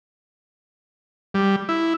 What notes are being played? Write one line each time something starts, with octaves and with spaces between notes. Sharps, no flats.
G3
E4